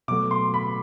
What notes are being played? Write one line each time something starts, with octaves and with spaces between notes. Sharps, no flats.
B2 F#3 A3 D6
C6
B5